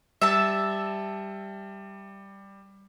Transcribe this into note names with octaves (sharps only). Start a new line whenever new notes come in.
G3 E5 A5